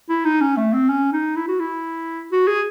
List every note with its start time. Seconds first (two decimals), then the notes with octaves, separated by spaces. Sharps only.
0.09 E4
0.25 D#4
0.41 C#4
0.57 A3
0.73 C4
0.89 C#4
1.13 D#4
1.36 E4
1.48 F#4
1.60 E4
2.32 F#4
2.47 G#4